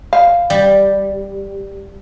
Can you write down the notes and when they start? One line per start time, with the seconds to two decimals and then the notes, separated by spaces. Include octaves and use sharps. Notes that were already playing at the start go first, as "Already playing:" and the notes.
0.13 F5
0.50 G3